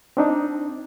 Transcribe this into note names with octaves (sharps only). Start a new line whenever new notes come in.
C4 D4 D#4